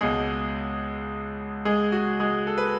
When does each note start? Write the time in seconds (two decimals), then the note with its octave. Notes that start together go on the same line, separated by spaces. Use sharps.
0.01 C#2 B2 G#3 G#4
1.65 G#3 G#4
1.92 F#4
2.20 G#3 G#4
2.47 A4
2.58 B4